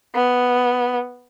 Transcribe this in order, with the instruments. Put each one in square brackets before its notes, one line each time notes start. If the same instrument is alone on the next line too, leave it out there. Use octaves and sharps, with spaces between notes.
[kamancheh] B3